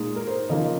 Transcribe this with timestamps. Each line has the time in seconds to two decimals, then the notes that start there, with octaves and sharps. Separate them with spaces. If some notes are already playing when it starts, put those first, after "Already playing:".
Already playing: A#2 G#3 D#4
0.16 A#4
0.27 C5
0.49 C#3 F3 A#3 D#4 D#5